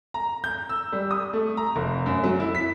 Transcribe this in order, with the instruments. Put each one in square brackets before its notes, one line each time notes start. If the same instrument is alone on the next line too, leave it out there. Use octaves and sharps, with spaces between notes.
[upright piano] A#5
G6
E6
G3
D#6
A3
A#5
F1
F#2
F#3
E4
B6